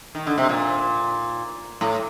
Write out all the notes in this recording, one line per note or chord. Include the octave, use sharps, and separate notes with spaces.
D#3
D3
C3
A#2
A2